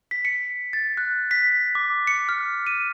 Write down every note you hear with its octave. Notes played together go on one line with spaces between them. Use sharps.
B6
C#7
A6
F#6
B6
D6
C#7
F6
D#7